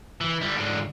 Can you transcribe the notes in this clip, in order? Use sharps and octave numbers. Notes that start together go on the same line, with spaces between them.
E3
D3 G3
G#2 D3